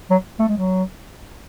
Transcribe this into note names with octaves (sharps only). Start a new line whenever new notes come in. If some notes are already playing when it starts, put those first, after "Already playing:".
F#3
A3
G#3
F#3